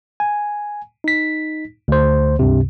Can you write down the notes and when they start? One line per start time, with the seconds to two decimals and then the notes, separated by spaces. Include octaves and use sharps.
0.20 G#5
1.04 D#4 B6
1.88 D2 C5
2.39 C#2 G2 C3